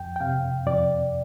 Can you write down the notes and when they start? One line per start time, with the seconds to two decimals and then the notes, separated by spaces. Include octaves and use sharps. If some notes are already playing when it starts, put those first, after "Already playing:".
Already playing: F2 G5
0.16 G5
0.21 C3 F5
0.67 F2 D5